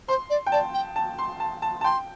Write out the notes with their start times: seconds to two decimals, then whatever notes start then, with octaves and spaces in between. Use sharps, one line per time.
0.08 C5 C6
0.30 D5
0.46 G5
0.52 D5 A5
0.74 G5
0.96 A5
1.18 C6
1.40 A5
1.62 A5
1.81 A5
1.84 G5 C6